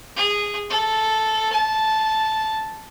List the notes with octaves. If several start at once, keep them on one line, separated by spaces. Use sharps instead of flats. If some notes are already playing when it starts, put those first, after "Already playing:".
G#4
A4
A5